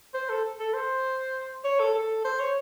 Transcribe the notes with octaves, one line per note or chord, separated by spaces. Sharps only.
C5
A4
A4
C5
C#5
A4
A4
C5
C#5